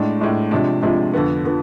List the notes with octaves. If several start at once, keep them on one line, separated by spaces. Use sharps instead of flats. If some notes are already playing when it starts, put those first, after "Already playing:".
Already playing: A2 G#3 D4
A2 G#3 D4
C3 F3 G#3 D4
C3 F3 G#3 D4
F2 D3 F3 B3
D3 F3 B3